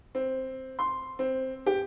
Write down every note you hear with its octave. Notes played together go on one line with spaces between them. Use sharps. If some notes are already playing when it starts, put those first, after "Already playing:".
C4
C6
C4
G4